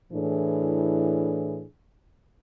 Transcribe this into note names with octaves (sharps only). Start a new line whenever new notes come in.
A2 E3 D4 G#4